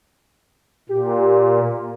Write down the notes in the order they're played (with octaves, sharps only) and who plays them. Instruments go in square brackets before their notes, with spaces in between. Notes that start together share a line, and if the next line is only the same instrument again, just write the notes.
[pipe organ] A#2 [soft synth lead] G4